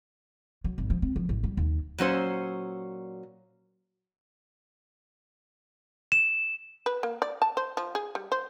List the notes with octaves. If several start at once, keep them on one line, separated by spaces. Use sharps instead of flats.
F#3
G#1
F3
C4
F3
A1
G3
D#2
A#2 F#3 C#4 C5
E7
B4
A#3
D5
A5
C5
F3
G#4
G3
C5